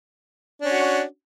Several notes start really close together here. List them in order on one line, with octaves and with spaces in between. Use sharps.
D4 C#4 F#4